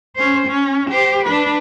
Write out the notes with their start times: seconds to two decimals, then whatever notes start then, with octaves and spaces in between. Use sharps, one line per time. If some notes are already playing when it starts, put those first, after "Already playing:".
0.16 C#4 C5
0.47 C#4
0.90 G4 C5
1.24 D4 B4